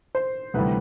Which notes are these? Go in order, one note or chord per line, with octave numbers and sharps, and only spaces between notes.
C5
D2 C3 E3 G3 B4